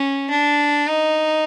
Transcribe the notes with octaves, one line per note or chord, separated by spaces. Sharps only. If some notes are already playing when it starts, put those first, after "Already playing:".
Already playing: C#4
D4
D#4